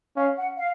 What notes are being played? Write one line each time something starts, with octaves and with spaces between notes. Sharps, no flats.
C#4 F5
F#5
F5